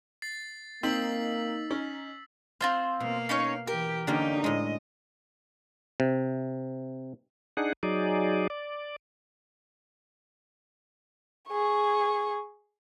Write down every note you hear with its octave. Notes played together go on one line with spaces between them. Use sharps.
A6 C7
A#3 C4 D#4 E6 B6 F#7
C#4
C4 F4 C5 F5
B2 A#3 F5
C#4 D#4 C#5
E3 G4 A#4
D3 A#3 C#4 D#4 G4
A2 G#3 D#5
C3
D4 D#4 G#4 F#5
F#3 D#4 G#4 D5
D5
G#4 C#6